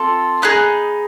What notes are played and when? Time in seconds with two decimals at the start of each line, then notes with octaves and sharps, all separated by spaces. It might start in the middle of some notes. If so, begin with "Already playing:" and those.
Already playing: C4 F4 A4
0.42 B3 D#4 G#4 F#6